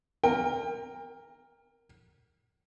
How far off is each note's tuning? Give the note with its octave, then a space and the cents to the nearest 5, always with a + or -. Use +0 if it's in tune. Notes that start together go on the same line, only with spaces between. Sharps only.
A#4 +0 G5 +35